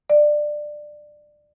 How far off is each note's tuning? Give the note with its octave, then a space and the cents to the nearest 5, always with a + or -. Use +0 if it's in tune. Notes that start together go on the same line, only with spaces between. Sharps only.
D5 +20